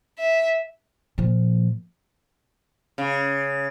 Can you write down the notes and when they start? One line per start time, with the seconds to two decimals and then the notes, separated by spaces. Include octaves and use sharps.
0.19 E5
1.18 A#2 F3
2.98 C#3